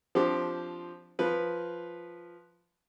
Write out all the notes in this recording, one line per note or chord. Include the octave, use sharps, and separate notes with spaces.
F3 C4 D4 G4
F3 B4